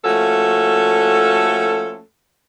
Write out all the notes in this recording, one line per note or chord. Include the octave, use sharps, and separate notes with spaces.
F3 A3 A#3 C#4 F#4 A4